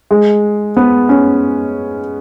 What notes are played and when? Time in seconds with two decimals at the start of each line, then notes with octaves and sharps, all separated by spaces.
0.11 G#3
0.77 B3
1.09 C#4